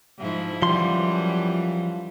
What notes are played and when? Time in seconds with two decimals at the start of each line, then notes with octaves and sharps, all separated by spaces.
0.18 G#2 F3 E4
0.62 F#2 E3 F3 G3 C6